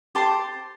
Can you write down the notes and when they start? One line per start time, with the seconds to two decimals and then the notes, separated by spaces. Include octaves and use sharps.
0.15 G4 C5 A5 C6